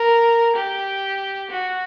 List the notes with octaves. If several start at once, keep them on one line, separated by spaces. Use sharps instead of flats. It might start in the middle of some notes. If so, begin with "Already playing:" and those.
Already playing: A#4
G4
F#4